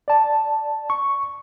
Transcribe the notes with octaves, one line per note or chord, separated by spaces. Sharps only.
D5 A5
C#6